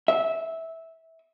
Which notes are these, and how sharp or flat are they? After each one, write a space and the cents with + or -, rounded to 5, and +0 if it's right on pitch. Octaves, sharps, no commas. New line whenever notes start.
E5 -15